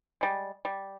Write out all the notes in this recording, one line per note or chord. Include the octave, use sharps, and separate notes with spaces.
G3 G#3
G3